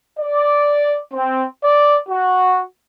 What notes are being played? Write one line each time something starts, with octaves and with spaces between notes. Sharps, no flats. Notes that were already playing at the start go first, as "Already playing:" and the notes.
D5
C4
D5
F#4